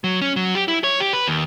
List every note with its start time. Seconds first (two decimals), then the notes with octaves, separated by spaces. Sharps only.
0.04 F#3
0.22 C#4
0.36 F#3
0.55 G4
0.68 E4
0.84 C#5
1.00 G4
1.13 B4
1.28 D#2